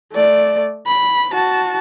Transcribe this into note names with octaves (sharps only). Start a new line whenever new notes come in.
A3 D5
B5
F#4 A5